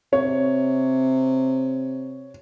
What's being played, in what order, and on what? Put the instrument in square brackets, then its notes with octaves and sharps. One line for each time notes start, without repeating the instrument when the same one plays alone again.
[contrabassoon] C3 [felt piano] C#5